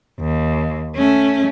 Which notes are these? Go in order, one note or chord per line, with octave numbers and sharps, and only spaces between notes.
D#2
A3 C#4